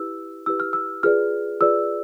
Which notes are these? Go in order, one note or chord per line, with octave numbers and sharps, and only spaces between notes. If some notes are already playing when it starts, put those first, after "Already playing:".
Already playing: E4 G4 B4 E6
E4 G4 B4 E6
F6
E6
F4 G#4 B4 D5 F6
F4 G#4 B4 D5 E6